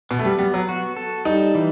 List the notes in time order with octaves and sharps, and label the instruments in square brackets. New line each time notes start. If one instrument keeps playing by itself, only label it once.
[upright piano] B2 [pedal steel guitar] B3
[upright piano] A3
G3
[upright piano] G3 [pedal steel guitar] B3
[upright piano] F#3
[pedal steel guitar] F#4
A4
[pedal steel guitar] G3 [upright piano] D#4
[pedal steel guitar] E3